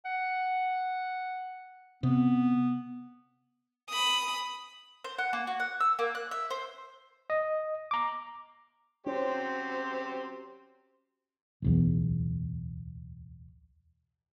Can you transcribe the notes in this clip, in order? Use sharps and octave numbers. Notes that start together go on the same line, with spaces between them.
F#5
C3 B3
B5 D#6
C5
F#5
A#3
F#4
F#5
E6
A#3
F#6
E5
C5
D#5
A#5 D6
F#3 C4 C#4 G4 C5
D1 B1 E2